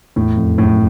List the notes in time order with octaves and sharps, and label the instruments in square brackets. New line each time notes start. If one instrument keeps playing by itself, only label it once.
[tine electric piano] E2 [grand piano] A2
[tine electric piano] F2
[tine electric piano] F#2 [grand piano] A2